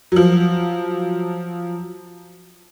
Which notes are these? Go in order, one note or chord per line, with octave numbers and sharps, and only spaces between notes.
F3 F#3